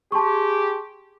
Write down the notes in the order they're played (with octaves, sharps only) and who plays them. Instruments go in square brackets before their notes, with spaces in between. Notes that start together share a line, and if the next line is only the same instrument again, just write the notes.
[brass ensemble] G4 G#4 [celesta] A5 C6 C#6